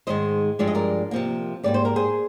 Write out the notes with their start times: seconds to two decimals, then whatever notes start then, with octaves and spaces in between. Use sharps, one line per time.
0.07 G#2 D#3 G#3 C5 D#5
0.59 G2 F3 G#3 D5
0.68 D#5
0.75 A#4 D5
1.11 C3 F3 A#3
1.64 G#2 G3 A#3 D5
1.74 C5
1.85 A#4
1.96 G#4 C5